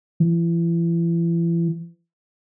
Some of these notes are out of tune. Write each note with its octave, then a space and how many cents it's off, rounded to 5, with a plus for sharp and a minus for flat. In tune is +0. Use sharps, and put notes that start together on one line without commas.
E3 +35